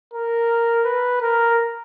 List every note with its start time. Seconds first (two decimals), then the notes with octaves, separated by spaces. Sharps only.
0.14 A#4
0.85 B4
1.21 A#4